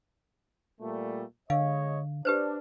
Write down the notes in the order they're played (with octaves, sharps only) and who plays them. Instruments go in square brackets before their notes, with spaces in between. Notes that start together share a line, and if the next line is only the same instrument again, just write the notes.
[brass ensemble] A#2 G3 A3
[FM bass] D3 [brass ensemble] G#3 C#5 D#5 [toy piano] F5
[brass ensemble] D4 [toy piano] G4 B4 C5